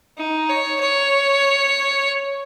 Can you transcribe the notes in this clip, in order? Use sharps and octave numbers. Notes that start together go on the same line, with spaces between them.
D#4
C#5
C#5